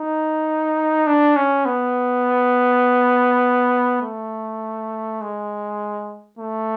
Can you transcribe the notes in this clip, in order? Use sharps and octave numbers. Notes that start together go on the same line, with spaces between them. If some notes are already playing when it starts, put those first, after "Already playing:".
Already playing: D#4
D4
C#4
B3
A3
G#3
A3